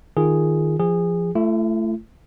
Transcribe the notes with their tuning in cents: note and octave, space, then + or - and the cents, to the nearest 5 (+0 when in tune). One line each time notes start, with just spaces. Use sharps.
D#3 +0 F4 +0 G#4 +0
F3 -20 G#4 -20
A3 +0 E4 +45